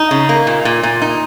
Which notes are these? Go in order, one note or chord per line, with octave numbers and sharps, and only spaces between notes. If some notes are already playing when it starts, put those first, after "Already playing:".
Already playing: D#4
C#3
A#3
A#2
A#2
A#2
D#4